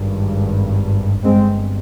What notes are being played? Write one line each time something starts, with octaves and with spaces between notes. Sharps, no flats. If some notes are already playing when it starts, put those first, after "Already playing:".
Already playing: G#1 G2
G1 G2 G#3 C4